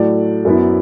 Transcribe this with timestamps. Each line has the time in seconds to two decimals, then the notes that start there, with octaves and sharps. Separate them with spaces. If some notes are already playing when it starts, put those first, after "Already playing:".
Already playing: A2 F#3 A3 D5
0.45 F#2 F#3 B3 E4